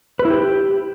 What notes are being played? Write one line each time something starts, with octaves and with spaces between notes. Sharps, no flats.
B4
E4
G4